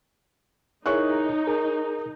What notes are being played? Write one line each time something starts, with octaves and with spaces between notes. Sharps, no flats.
D#4 E4 G#4 A#4 C#5 C#6 F#6
G#4 A#4